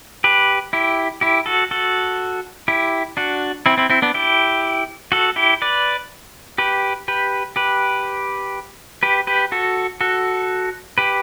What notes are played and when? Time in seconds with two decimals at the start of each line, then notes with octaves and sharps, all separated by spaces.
0.24 G4 B4
0.73 E4 G4
1.21 E4 G4
1.46 F#4 A4
1.71 F#4 A4
2.68 E4 G4
3.17 D4 F#4
3.66 C4 E4
3.78 C4 E4
3.90 C4 E4
4.02 B3 D4
4.14 E4 G4
5.12 F#4 A4
5.36 E4 G4
5.62 B4 D5
6.58 G4 B4
7.08 G4 B4
7.56 G4 B4
9.03 G4 B4
9.27 G4 B4
9.52 F#4 A4
10.01 F#4 A4
10.98 G4 B4